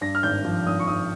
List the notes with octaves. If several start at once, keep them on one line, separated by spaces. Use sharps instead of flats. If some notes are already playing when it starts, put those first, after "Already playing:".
G2 A#6
F6
G#1 G6
F3
G#1 D#6
C#6
G#1 D#6